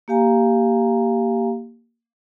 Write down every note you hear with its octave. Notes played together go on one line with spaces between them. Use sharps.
A#3 G4 F5 G#5 A#5